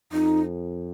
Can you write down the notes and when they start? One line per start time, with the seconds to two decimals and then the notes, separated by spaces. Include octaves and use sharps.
0.12 F2 D#4